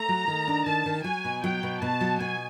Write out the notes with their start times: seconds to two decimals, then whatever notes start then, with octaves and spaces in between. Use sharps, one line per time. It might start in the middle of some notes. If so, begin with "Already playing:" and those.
Already playing: A3 A#5
0.09 F#3
0.28 D#3
0.48 D4
0.66 D#3 A5
0.86 D#3
1.04 F#3 G#5
1.24 B2
1.43 F#3 G5
1.63 B2
1.81 B2 A5
2.01 F#3
2.19 B2 G#5